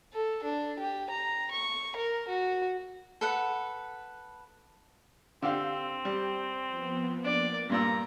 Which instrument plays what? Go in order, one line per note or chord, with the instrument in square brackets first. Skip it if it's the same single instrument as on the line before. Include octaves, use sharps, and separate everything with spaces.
[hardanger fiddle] A4
D4
G4
A#5
C#6
A#4
F#4
[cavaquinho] A4 B4 F#5
[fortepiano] D3 G4 F5 [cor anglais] C4
[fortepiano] G3
[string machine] F3 B3
[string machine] A#3 [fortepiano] D4 [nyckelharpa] D5
[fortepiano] G2 A#2 E6 [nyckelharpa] A#5